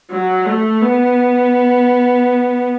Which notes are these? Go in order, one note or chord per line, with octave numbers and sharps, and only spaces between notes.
F#3
A3
B3